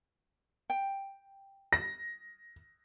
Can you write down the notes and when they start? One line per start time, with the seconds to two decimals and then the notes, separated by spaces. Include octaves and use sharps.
0.70 G5
1.73 A#6